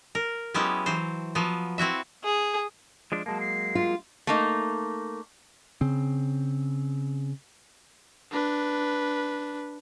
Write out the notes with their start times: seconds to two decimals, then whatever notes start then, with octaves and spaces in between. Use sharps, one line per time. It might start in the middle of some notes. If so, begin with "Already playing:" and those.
0.15 A#4
0.54 F#3 G#3 B3 C#4 E4 G4
0.86 E3 F#3 C5
1.35 F3 F#3 B3
1.78 C4 E4 F#4 E5
2.24 G#4
3.12 F3 G#3 D4
3.26 F#3 G#3 A#3 A5
3.40 C7
3.75 F4
4.27 A3 A#3 D#4
5.81 C#3 C4
8.31 D4 B4